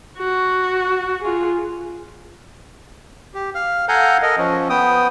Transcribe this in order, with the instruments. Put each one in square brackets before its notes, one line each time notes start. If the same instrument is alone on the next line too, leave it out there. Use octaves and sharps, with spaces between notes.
[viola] F#4
F4 G#4
[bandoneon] G4
F5 F6
A4 F5 F#5 G#5 A#5 G6
A4 A#4 D#5
F3 C#4
B3 G5 D#6